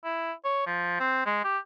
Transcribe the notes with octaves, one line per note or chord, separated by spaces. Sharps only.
E4
C#5
F3
C4
G#3
G4